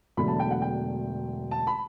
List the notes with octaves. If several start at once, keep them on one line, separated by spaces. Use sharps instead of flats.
E1 E2 D3 F#3 A3 B5
A5
G5
F#5
G5
A5
B5